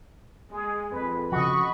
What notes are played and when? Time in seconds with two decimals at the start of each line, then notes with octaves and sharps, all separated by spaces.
0.51 G#3 G#4
0.92 F2 B4
1.32 C#3 F3 F#4 D#5 B5 C#6